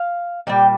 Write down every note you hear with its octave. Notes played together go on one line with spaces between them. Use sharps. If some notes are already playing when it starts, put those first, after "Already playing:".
Already playing: F5
A#2 G3 G5